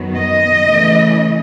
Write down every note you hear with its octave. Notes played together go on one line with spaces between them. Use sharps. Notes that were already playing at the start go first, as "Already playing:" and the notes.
Already playing: F#2 D#3 F#3 B3
D#5
C#3 E3 A3 C#4